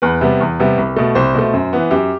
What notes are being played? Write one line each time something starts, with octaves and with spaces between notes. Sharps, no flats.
E2 B4
C3 G3 B3
E2
C3 G3 B3
C2
B2 A3
C2 C5
B2 A3
F#2
E3 B3
F#2 G4